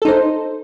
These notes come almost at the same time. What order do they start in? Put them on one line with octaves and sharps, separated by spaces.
A4 D#4 C5